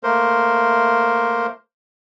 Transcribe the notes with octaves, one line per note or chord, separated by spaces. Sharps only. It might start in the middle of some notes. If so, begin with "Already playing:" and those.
A3 A#3 A#4 C5